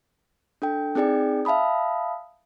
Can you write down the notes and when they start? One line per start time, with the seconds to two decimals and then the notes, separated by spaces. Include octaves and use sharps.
0.62 D4 A4 G5
0.95 C4 D#4 G#4 D5 G5
1.45 E5 F5 A5 B5 D#6